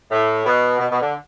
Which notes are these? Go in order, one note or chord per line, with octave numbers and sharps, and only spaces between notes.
A2
B2
B2
B2
D3